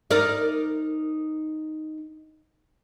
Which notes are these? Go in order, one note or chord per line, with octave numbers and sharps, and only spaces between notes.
D#4 A#4 D5